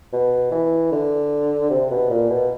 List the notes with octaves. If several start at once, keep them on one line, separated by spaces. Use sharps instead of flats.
B2
E3
D3
C3
B2
A#2
B2